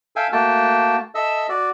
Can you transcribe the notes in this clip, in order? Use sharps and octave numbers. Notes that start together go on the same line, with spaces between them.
A4 E5 F5 G5 G#5
A3 A#3 F#4 G5 A5
A4 D#5 E5 E6
F#4 D5